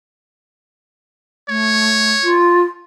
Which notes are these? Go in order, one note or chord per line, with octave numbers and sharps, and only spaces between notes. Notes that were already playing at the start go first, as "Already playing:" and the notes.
A3 C#5
F4